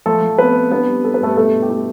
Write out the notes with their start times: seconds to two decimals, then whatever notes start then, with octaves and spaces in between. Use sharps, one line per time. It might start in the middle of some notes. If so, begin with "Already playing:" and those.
0.06 F3 A3 A4
0.22 F3
0.38 B3 C4 B4
0.55 C4
0.71 B3 D4 B4
0.87 G3
1.04 G3 A4
1.14 B4
1.21 G2 A3 A4
1.37 B2 A3 A4
1.53 B2
1.62 G4
1.69 A3 E4 A4